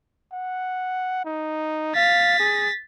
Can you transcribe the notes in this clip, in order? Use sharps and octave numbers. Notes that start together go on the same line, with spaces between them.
F#5
D#4
F5 A6 B6
G#4